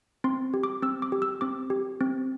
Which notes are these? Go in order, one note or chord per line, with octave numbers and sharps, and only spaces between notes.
C4 C6
G4
D6
C4 E6
D6
G4
E6
C4 D6
G4
C4